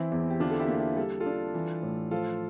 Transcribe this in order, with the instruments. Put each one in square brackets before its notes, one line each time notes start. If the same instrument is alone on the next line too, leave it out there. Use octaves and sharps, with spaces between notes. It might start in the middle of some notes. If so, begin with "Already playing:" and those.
Already playing: [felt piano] E3 [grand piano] C4 E4
[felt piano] E2
[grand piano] G4
[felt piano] D3 [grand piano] D4 F4
[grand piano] A4
E4 G4
[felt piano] A#3
[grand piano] E4 G4
[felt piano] G3 [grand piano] A4
[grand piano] F4 A4
[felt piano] D4
E3
A2
[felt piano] F3 [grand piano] F4 A4